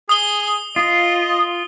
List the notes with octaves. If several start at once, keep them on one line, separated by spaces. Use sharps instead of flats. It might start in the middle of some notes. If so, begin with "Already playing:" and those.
G#4 D#6 G7
F4 D#5